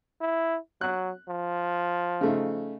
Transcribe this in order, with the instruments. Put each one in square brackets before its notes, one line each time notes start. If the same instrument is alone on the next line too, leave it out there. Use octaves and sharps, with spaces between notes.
[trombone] E4
[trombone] F#3 [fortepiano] F#6
[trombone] F3
[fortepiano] C#3 A3 D#4